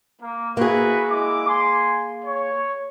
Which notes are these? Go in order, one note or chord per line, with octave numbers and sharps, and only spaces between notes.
A#3
A#3 E4 F#4 G#4 B4
G#3 E4 D6
G#5 C6
C#5